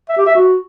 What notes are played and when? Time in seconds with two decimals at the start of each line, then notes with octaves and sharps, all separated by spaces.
0.09 E5
0.18 G4
0.26 E5
0.35 F#4